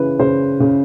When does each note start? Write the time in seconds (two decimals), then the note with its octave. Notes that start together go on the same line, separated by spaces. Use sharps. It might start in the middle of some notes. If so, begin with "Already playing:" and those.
Already playing: C#3 E3 B4
0.19 C#3 C5
0.60 C#3